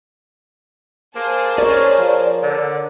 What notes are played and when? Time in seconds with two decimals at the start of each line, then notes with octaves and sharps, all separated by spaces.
1.16 A#3 G#4 C5 A5
1.58 C#4 A#4 C#5 D5
1.99 F3
2.43 D3